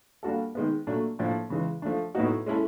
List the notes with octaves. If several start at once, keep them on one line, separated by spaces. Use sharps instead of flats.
G3 A#3 D4 F#4 A4
D#3 G#3 B3
A#2 F#3 A3 D4
A2 F3 A#3 D4
C#3 E3 G#3
F3 A3 D4
A2 F#3 B3 D#4 F#4
G#3 C#4 E4 A4